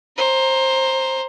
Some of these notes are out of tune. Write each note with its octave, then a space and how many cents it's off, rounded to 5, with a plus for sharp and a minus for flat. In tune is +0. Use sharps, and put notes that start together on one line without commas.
C5 +15 A#5 +0